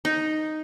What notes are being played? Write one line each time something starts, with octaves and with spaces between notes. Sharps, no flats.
D#4